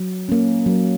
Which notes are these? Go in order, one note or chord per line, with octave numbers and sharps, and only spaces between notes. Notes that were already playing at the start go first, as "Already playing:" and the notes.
Already playing: F#3
A#3 C#4
F#3